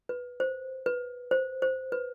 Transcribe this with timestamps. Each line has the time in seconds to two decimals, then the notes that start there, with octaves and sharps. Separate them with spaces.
0.09 B4
0.40 C5
0.86 B4
1.31 C5
1.62 C5
1.92 B4